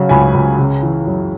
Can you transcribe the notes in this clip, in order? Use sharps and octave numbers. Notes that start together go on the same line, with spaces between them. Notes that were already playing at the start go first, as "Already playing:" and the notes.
Already playing: C#3 F#3
C#2 G#5 B5
C#2
C#3
E3
F#2